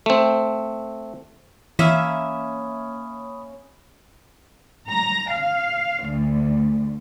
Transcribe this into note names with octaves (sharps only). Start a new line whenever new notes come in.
A3 C4
E3 A#3 C#4 E5 B5 C#6 D#6 B6
A#5
F5
D2